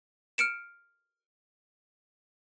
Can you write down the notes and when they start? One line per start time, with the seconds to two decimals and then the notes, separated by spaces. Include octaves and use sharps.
0.38 F6 C#7 D7 E7